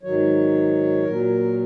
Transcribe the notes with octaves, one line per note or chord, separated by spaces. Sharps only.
G#2 D#3 F#3 C#5
A#2 F#3 A#4